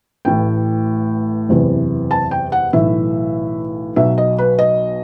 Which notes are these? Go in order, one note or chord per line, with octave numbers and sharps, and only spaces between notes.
A1 A2 E3 G5
F#1 E2 C3 E3
A5
G5
F#5
B1 A2 E3 E5
B1 B2 F#3 E5
D#5
B4
D#5